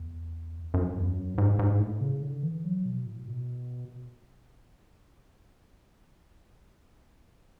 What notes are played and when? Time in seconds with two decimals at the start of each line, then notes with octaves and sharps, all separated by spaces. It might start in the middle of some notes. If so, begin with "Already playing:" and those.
Already playing: E2
0.74 F#2
0.98 E2
1.06 F#2
1.38 G#2
1.59 G#2
1.79 A2
2.01 C#3
2.22 D3
2.43 E3
2.64 F#3
2.85 B2
3.06 A2
3.28 B2